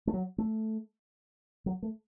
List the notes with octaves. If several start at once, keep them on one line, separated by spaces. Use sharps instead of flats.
A3
F#3
A3
F#3
A3